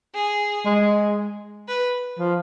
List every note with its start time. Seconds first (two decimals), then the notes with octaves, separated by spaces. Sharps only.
0.14 G#4
0.65 G#3
1.68 B4
2.19 F3